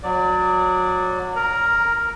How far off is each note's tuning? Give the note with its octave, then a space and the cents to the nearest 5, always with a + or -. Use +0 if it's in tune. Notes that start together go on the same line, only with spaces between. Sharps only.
F#3 -20 D5 +0
A#4 +0 A#5 +20